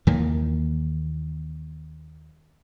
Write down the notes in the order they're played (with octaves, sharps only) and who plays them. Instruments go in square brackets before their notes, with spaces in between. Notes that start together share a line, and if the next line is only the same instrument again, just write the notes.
[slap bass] D#2 D#3 E3 A#3